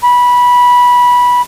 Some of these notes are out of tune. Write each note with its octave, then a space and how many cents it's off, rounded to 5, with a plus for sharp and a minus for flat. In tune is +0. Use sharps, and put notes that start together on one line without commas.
B5 -15